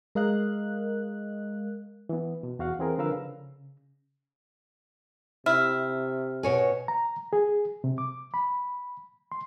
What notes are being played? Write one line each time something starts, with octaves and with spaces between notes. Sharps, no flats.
G#3 A#4 D#5 F5 F#6
E3 B3
B2
E2 F#4 F5 F#5
E3 C4 G#4 A#4
D3 F3 A#4 B4 F5 E6
C#3
C3 E4 F6
B2 C#5 G#5
A#5
G#4
C3
D6
B5
C6